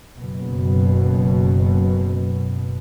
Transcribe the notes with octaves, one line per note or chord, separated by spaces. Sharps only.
F#1 B2